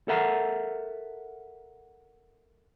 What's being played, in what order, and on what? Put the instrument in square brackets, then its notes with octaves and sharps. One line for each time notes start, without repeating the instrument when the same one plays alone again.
[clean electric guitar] A4 A#4 E5 F#5 A#5